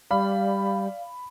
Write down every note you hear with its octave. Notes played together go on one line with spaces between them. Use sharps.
G3 D5 F5 B5